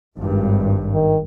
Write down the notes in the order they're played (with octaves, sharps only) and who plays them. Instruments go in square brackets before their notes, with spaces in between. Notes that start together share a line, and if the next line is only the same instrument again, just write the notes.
[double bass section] G#1 G2
[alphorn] D#3